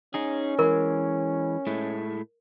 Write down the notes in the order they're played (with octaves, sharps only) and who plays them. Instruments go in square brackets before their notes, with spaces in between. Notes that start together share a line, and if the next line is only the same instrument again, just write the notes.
[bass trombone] C#4 [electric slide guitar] D#4 G#4
[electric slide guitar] E3 G#3 [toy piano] A#4
[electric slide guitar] A2 G#3 A3